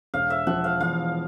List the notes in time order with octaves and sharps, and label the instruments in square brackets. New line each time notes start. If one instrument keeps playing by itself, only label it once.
[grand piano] E1 [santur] F5
[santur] E5
[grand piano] F3 [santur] F#5
[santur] F5
[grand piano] E2 [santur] F5